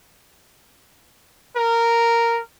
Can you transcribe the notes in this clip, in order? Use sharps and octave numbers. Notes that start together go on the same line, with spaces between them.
A#4